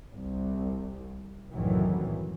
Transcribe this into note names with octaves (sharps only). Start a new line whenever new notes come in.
C2
F#1 C2 A2 D#3 E3 F#3